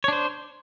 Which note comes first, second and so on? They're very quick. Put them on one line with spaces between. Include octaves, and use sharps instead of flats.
C#5 D4 C5